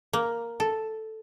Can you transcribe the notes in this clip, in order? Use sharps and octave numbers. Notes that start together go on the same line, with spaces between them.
A#3
A4